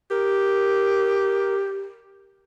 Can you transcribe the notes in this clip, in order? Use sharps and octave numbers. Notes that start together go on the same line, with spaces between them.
G4 A#4